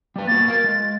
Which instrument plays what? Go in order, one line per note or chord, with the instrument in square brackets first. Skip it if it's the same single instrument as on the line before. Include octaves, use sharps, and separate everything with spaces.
[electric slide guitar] G3 B4
[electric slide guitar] A#3 B3 F#4 [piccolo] A6
[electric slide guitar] A#4 F5
G#3